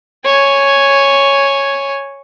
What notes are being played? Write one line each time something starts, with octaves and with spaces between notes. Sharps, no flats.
C#5 G#5